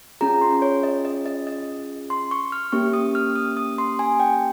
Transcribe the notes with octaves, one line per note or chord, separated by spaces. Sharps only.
C#4 F4 G#4 A#5
C6
C#5
D#5
D#5
D#5
D#5
C6
C#6
F6
A#3 C#4 G4 C#6
D#6
F6
D#6
D#6
C6
G#5
G5